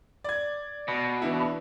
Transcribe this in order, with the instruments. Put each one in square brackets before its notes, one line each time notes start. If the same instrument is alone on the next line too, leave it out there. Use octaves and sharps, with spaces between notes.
[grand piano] D5 G#6
[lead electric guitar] B2
[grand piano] E3 D4 E4